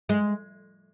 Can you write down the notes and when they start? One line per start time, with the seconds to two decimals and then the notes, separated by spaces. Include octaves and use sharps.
0.09 G#3